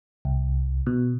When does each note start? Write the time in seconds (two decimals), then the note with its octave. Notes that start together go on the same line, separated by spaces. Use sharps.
0.25 C2
0.87 B2